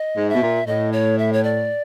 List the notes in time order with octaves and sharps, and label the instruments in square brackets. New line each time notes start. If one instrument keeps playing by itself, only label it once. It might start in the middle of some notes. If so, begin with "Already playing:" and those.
Already playing: [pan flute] D#5
[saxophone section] G#2
[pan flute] E5
[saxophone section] B2
A#2
[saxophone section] A2 [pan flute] D#5
[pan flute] C#5
E5
C#5
D5